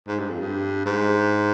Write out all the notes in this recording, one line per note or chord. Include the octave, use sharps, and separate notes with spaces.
G#2
G2
F2
G2
G#2